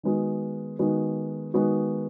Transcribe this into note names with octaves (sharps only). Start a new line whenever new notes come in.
D#3 G#3 B3 F#4
D#3 G#3 B3 F#4
D#3 G#3 B3 F#4